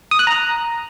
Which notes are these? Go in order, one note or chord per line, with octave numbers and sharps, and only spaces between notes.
D#6
F#6
A#5